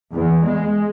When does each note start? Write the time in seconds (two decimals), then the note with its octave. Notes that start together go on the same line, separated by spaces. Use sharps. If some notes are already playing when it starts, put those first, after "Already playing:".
0.13 E2
0.45 G#3